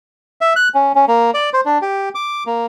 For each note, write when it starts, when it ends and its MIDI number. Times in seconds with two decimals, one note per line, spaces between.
0.41 0.53 76
0.56 0.68 90
0.74 0.92 61
0.95 1.05 61
1.08 1.31 58
1.34 1.50 74
1.53 1.61 72
1.65 1.78 62
1.82 2.09 67
2.15 2.44 86
2.46 2.66 58